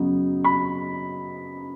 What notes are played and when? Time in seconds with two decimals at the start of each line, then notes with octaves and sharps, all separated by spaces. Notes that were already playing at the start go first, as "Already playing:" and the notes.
Already playing: F#2 C#3 F#3 B3 D#4
0.44 B5